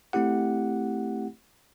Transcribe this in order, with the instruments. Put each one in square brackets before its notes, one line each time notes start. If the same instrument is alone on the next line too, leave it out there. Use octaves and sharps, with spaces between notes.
[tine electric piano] A3 C4 E4 G4 F#5